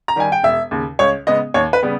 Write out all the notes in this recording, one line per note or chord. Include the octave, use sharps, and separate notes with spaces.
A#5
D#3 G3 G#5
G5
E1 E5
D#2 C#3
C#2 C#5
C#3 G#3 B3 D#5
D#2 C#5
B4
C#3 G3 B3